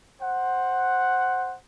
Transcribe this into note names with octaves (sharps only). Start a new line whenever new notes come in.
C5 F#5